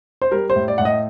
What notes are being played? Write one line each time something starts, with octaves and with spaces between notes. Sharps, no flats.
C5
G3 A#4
C5
A2
D5
A2 F#5
D#5